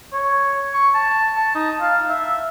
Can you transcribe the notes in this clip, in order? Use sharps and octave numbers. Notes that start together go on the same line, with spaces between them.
C#5
C#6
A5
A5
D#4
F5
E5